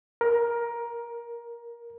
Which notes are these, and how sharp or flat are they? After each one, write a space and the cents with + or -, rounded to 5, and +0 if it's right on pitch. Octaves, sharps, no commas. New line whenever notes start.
A#4 +15